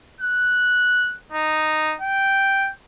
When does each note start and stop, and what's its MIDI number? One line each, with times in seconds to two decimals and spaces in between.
0.21 1.15 90
1.32 1.95 63
2.01 2.70 79